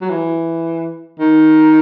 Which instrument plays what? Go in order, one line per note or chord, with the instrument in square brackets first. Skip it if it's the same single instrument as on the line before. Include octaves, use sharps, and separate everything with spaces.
[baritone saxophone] F#3
E3
D#3